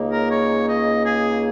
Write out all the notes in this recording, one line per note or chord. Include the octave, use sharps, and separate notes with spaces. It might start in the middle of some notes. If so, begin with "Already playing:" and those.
Already playing: C#2 C#3 A#3 D#4
A#4
C#5
D#5
G#4